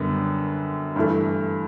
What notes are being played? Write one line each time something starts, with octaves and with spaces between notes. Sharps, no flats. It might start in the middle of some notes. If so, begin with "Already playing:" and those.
Already playing: F#2 D3 G3 B3
G2 E3 A3